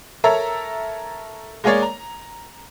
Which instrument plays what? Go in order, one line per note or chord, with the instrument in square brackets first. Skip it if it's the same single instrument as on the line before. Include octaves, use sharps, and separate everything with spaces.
[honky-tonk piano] A4 A#4 C#5 E5 A#5
G#3 A#3 G#4 A#4 C#5 D5
A#5